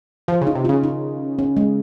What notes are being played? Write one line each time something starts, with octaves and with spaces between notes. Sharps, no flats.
F3 F4
C#3
D#4
C3
C#3 F4
D#4
C#4
G#3